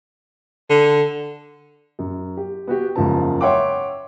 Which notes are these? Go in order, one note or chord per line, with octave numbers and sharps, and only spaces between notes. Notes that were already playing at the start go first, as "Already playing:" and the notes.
D3
F#2
G4
B3 F#4 G4
F#1 E2 G#2 C#3 F3 A5
C#5 E5 F#5 G5 C6 D6